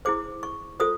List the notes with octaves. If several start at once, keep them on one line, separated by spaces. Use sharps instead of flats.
E4 G#4 C5 D6
C#6
F4 A4 C5 D#6